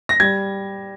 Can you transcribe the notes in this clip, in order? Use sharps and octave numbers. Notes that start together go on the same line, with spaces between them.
A#6
G3 G#6